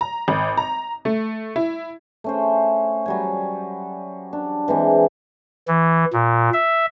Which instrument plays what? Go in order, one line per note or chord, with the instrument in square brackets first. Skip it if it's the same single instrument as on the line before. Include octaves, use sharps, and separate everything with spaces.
[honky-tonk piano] A#5
G#1
A#5
A3
E4
[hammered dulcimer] A3 C#4 C5
F#3 G3 G#5
D4
E3 G#3 C4
[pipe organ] E3
A#2
E5